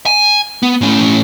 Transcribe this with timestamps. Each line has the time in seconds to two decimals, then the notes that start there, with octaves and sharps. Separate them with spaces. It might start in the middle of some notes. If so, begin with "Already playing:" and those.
0.06 G#5
0.63 B3
0.81 A2 C#4